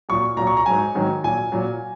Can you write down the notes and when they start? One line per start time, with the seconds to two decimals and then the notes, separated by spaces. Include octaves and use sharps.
0.09 A#2 F#3 C#6
0.37 A#2 F#3 A#5
0.47 C#6
0.57 A#5
0.66 G#2 F#3 G#5
0.95 G#2 D#3 F#3
1.24 A#2 F#3 G#5
1.52 A#2 F#3